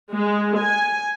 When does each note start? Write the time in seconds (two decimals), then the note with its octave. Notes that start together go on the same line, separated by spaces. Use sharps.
0.12 G#3
0.58 G#5